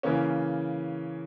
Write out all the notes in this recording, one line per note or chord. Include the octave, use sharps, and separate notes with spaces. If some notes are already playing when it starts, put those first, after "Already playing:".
C#3 E3 A#3 C#4